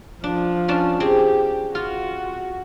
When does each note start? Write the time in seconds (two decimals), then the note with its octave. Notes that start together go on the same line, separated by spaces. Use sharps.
0.24 F3 D4
0.68 C#4 D4 A5
1.00 C4 G4 G#4
1.75 F4 F#4